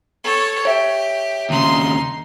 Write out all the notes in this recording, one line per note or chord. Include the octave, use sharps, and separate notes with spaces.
A4 C#5
G4 C#5 E5
D#2 C#3 D#4 C6